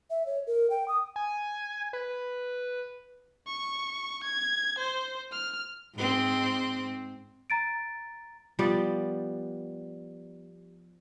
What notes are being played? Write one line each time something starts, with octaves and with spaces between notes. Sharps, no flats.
E5
C#5
A#4
G5
D#6
G#5
B4
C#6
G#6
C5
F6
G#2 C4
A#5 A6 D7
F3 G3 B3 D5